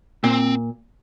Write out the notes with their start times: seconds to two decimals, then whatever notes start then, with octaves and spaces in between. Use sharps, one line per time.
0.24 A#2 C4